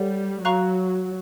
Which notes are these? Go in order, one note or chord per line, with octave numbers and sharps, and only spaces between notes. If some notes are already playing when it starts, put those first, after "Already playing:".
Already playing: G3 A4 C#5 F#5
F#3 F5 A#5 C#6 F#6